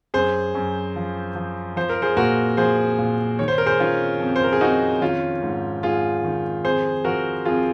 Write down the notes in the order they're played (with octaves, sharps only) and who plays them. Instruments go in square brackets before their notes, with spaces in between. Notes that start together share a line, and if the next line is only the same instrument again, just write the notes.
[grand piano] F#2 G#4 C5
F#2
F3
F3
F3 C5
A#4
G#4 C5
A#2 F#4 A#4
F3 G#4 C5
A#2
D#3 C#5
C5
A#4
G#4 C5
D#3 C#4 F4
F2
C5
A#4
G#4
F2 D#4 F#4
D#3 C#4 F4
G#2
G#2 F4 G#4
D#3
F2 G#4 C5
F3 F#4 A#4
F2 F4 G#4